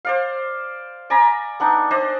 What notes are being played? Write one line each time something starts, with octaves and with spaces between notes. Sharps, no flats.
C5 D5 F5
D5 G#5 A#5 B5
B3 D4 D#4
D4 C5 D5 D#5